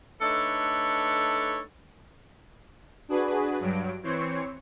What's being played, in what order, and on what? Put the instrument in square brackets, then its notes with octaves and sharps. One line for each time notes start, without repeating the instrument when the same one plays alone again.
[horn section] A3 D4 D#4 A4 B4 C#5
[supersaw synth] D4 F#4 G#4 B4
G2 F#3 D7
E3 C4 C#5 C6 C#7